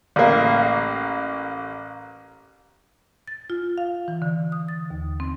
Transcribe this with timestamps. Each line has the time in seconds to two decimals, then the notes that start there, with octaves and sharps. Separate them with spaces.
0.16 A1 A#3
3.28 A6
3.50 F4
3.78 F5
4.08 E3
4.22 D3
4.52 D#6
4.69 A6
4.90 D#2
5.20 C4